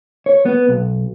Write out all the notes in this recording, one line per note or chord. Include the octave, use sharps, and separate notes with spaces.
C#5
B3
B1